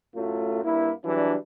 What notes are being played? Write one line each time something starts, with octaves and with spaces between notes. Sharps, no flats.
F#2 A2 F#3 A3 F4
G2 A#3 E4
E3 F#3 G3 D4